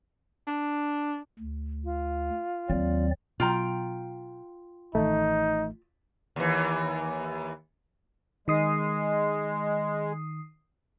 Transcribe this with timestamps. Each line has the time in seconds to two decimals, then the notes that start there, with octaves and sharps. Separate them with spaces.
0.47 D4
1.39 D2
1.84 F4
2.70 D#2 F#3 C4 D5
3.40 B2 F#3 F4 G5 A#5
4.95 A1 D#3 A3 D#4
6.36 D#2 E3
8.48 D#3 G#3 D#6 C7